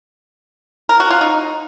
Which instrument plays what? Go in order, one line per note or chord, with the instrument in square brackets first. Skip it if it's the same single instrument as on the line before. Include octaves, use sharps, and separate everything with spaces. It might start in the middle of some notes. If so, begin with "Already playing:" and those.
[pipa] A#4
F#4
F4
D#4